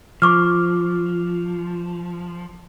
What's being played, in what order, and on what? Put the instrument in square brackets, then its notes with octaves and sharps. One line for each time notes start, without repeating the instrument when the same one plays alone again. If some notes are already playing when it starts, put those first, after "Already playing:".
[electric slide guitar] F3 [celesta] C#6 D6 F6